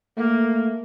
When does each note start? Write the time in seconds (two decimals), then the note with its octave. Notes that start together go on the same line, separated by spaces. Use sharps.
0.17 A3 A#3